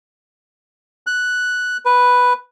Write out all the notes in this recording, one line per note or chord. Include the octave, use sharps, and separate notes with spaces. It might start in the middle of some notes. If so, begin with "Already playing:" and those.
F#6
B4